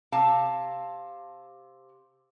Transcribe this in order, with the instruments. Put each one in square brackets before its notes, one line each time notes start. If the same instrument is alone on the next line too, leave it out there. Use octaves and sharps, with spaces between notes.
[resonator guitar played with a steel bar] C3 F5 A5